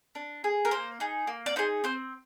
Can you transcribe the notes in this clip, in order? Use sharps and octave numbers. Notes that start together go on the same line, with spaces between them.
D4
G#4
A#4
A#3 C5
D#4 G#4
A#3
D5
D#4 G#4 C5
C4 C5